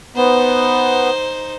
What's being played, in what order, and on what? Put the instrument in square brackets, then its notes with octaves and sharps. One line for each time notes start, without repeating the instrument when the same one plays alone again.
[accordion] B3 [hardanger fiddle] D#4 C5